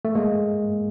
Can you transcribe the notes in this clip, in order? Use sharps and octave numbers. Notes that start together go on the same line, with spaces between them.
A3
G#3 A#3